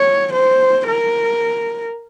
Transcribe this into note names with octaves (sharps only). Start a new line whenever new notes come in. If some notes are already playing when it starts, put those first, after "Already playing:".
Already playing: C#5
C5
A#4